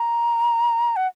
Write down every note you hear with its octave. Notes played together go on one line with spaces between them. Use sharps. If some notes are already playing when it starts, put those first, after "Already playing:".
Already playing: A#5
F#5